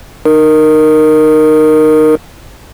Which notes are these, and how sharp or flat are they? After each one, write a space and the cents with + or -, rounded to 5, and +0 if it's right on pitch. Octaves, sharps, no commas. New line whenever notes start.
D#4 -25 A#4 +0